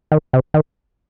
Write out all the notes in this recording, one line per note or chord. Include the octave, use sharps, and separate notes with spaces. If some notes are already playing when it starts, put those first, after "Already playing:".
D#3
C3
D#3